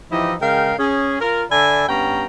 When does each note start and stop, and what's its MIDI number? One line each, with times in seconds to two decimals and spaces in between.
0.11 0.35 52
0.11 0.35 53
0.11 0.35 63
0.11 0.35 64
0.11 0.35 67
0.11 0.35 75
0.41 0.74 49
0.41 0.74 56
0.41 0.74 70
0.41 0.74 77
0.41 0.74 79
0.78 1.19 61
0.78 1.19 68
1.21 1.44 65
1.21 1.44 70
1.51 1.84 50
1.51 1.84 74
1.51 1.84 76
1.51 1.84 80
1.51 1.84 81
1.51 1.84 83
1.88 2.26 43
1.88 2.26 59
1.88 2.26 61
1.88 2.26 79
1.88 2.26 82